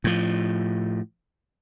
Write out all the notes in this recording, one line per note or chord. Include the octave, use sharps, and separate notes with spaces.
A2 F3